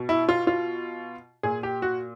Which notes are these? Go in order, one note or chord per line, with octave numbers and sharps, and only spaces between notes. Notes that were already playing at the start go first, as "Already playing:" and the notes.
Already playing: B2
E4
F4
F4
A#2 G#4
G4
F#4